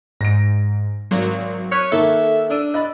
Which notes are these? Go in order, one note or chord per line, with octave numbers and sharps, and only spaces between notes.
G#2 A#6 D7
G#1 F#3 A#4
C#5 F6 F#6 B6 D#7
D#3 A#3 A4 E5
D4 E6 D#7
D#5 B5 F#6 A6